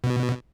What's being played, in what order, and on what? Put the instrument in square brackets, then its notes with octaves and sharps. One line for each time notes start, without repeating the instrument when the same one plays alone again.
[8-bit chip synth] B2